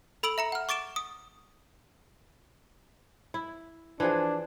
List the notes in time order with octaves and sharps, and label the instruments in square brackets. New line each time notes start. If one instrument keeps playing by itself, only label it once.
[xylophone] A4 B5 E6 D7 F#7
E5 A#5 C#7
F#5 F6
C#6 D6 A6 D7 E7
D#6
[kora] E4
[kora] E3 F3 G#4 [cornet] D4